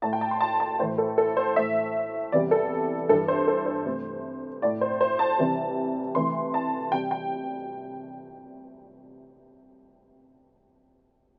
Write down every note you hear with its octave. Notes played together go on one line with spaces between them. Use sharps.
A2 A3 A5
G5
A5
C6
A5
A5
A2 E3 A3 C5
A4
A4
C5
A2 A3 E5
E2 C3 E3 G3 D5
A4
G2 E3 G3 A4
C5
A4
C5
C3 A3
A2 A3 D5
C5
C5
A5
C3 E3 G3
C3 E3 A3 C6
A5
C3 G3 G5
G5